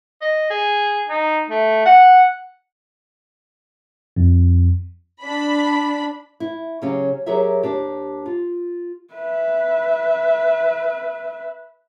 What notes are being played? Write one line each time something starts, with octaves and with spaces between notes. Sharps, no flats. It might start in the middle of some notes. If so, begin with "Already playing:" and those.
D#5
G#4
D#4
A3
F#5
F2
D4 B5
E4
C#3 F#3 C#4 G4 F5
F#3 G4 G#4 A#4 C#5 E5
D#2 D4 G4
F4
B4 E5